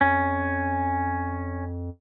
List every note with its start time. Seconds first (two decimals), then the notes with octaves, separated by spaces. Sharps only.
0.01 F2 C#4